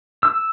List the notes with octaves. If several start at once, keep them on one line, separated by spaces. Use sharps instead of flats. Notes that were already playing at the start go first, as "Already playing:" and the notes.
E6